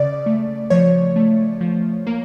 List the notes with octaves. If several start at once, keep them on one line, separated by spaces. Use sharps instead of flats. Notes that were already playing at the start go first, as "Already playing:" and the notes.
Already playing: C#3 D5
A3
F3 C#5
A3
F3
A#3